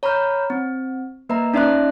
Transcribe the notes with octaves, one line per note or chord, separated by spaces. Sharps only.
C#5 A#5 B5 C#6 F6 G6
C4
A#3 B4 D#5 E5 A#5
C#4 D#4 D5 E5 C6 F#6